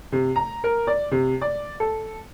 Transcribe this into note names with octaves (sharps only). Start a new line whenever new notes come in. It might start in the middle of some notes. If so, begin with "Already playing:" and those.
C3
A#5
A#4
D5
C3
D5
A4